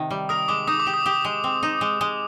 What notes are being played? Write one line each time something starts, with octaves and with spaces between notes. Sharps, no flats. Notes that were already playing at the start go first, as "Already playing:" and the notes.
Already playing: C3 D#3
G3
A#4 D#6
G#3 D6
D#4 D#6
D6
G4
D#6
G4 D#6
G#3
C4
D#4
G#3
G#3